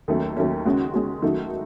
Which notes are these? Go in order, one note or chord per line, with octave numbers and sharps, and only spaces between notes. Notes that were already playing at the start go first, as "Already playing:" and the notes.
D#2 D#3 F#3 A3 C#4
D#2 D#3 F#3 A3 C#4
C#3 G#3 C#4 F#4
C#3 G#3 C#4 F#4
D#3 F#3 A3 D#4 F#4